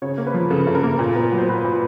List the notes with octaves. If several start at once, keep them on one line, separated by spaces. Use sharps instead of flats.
C#3 C#5
A#3
B4
F3
C#3 A4
C#3
A#4
A#3
A#2
B3
F#3
C5
A#2 B4
A#2